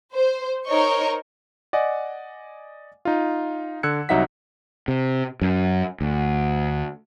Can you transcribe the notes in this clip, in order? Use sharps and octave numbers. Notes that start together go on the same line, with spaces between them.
C5
D#4 A#4 C5 C#5 D#5 C#6
D5 D#5 F#5 G#5
D#4 F4
D3 E6 F#6 G#6 C#7
C2 F#3 D#4 E5 F#5 B6
C3
F#2
D2